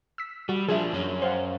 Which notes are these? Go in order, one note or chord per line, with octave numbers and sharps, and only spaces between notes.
E6 B6
G3 F#4
F3 D4 G#4 E5
F#2 C#4
C5 F5 F#5